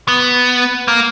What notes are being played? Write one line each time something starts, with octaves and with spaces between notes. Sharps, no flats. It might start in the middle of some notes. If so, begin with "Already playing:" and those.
B3
A#3